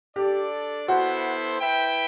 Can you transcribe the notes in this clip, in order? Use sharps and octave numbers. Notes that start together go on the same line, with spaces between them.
D4 G4 A4 D5
B3 E4 F#4 A4 C5
E4 B4 E5 G5